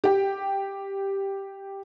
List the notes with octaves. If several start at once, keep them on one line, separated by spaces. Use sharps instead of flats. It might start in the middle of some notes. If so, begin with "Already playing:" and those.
G4 G5